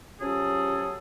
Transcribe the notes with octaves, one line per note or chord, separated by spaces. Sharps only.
C3 F#3 C#4 F4 G#4 A4